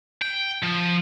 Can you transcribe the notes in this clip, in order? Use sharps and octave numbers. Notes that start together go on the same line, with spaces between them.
G5
F3